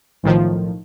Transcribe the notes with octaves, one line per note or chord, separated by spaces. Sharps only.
B1 A2 D#3 F3